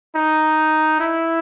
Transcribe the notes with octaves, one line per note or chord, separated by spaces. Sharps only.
D#4
E4